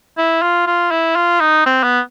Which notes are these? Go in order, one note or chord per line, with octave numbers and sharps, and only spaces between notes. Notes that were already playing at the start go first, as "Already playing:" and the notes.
E4
F4
F4
E4
F4
D#4
C4
B3